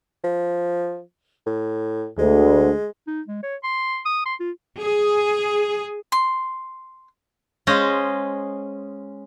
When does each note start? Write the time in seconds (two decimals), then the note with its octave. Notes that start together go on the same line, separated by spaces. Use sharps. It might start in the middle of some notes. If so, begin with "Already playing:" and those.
0.24 F3
1.47 A2
2.18 D2 G#3
3.07 D#4
3.28 G#3
3.43 C#5
3.64 C6
4.05 D#6
4.26 C6
4.40 F4
4.78 G#4
6.12 C6
7.67 G#3 C#4 C5 D#5 F5